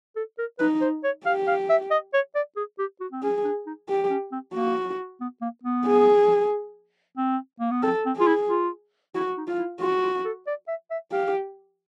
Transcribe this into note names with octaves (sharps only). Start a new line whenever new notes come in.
A4
A#4
D#4 B4
C5
C#5
G4 F5
F5
E5
D#5
C#5
D5
G#4
G4
F#4
C4
C#4 G#4
D4
D#4
G4
C#4
C4
A#3 F#4
B3
A#3
B3
G#4
C4
A#3
B3
C4 A4
C4
F4 G#4
E4
F4
E4 F#4
D#4
F4
E4
F4 F#4
F4
A4
D5
E5
E5
G4 F5